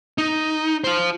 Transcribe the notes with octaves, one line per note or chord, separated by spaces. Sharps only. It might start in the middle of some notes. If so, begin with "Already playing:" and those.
D#4
F4 C5